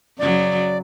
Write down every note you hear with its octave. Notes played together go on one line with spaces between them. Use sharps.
F#2 C#3 F#3 D5